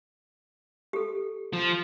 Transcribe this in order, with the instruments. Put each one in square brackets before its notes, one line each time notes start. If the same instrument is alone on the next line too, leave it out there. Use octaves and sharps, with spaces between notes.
[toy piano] G4 A4
[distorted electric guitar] F3